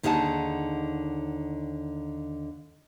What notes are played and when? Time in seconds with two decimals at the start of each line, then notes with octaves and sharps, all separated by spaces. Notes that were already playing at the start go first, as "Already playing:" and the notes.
0.03 D#2 D3 D#4 G#4 F#5 A5